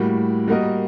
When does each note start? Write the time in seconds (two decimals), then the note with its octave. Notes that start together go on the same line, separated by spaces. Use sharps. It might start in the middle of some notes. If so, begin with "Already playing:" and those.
Already playing: A2 G3 A#3 F#4
0.48 G3 A#3 F#4 A#4 D#5